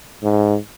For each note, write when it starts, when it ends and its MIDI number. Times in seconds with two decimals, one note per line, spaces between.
0.23 0.56 44